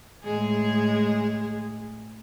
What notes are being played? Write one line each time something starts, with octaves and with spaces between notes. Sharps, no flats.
A2 G#3 G#4